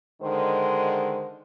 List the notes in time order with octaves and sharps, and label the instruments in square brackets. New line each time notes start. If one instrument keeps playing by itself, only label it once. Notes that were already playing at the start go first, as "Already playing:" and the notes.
[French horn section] D3 D#3 G#3 C5